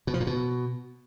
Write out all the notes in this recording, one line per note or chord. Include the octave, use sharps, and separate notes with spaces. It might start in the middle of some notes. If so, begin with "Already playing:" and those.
B2
F3
A#2
B2